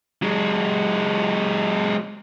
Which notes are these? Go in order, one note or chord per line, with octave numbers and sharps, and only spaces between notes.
F#3 G#3